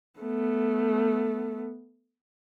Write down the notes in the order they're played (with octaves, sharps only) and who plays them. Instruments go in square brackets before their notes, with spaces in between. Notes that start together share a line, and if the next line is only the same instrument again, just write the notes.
[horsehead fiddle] A3 B3